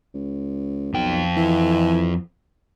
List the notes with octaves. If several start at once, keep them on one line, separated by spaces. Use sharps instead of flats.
C#2
B1 F2 G5
E3